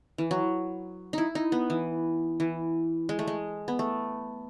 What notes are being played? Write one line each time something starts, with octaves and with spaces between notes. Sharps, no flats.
E3
F#3
D#4 E4
D#4
B3
E3
E3
G#3
A3
G#3
B3
A3